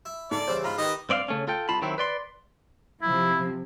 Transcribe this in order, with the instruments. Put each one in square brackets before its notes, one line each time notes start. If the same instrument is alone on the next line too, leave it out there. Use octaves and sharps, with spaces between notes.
[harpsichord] E4
[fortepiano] G#2 A4 [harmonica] D5
[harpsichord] C2 C#3 E3 [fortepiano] C5
[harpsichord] G#2 [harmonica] F4 [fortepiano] A#5 B5
[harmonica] D#3 D#5 [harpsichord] G4 B4
[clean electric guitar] G2 C4 D5 D#5 F5
C#3 A3 C#4
F4 A4 G5
C2 F4 A5 B5
D#3 F#3 C4 E4
B4 D5 C6
[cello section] C3 F3 [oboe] E4